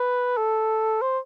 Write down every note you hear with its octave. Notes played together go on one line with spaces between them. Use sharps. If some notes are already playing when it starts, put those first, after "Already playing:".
Already playing: B4
A4
C5